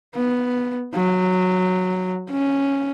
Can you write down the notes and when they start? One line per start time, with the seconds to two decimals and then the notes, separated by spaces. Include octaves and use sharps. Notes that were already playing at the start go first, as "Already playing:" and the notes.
0.16 B3
0.95 F#3
2.31 C#4